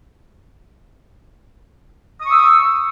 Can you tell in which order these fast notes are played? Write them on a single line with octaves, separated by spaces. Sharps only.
D#6 C#6 E6